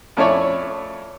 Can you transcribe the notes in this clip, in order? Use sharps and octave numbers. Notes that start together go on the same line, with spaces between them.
F2 A3 C#4 E4 C#5 D5